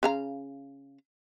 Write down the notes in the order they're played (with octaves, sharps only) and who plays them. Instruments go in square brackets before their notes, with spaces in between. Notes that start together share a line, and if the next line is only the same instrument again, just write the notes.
[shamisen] C#3 F5 A#5